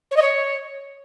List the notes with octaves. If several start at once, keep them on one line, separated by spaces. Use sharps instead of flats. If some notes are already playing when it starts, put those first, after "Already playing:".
C#5
D#5
C#5